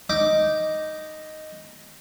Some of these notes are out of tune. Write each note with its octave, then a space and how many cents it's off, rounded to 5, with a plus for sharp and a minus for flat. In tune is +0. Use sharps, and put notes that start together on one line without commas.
D#4 +0 D6 +0